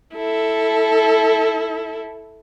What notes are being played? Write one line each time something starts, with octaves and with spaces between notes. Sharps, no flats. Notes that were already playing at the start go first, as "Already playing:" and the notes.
E4 A4